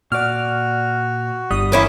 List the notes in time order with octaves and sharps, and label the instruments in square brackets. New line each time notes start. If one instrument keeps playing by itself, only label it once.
[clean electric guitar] A#2 D5 [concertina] F#4 [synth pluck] F6
[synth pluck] G1 D#6 [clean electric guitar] G3
[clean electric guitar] E3 [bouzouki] A#3 C#4 E4 [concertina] F5 G5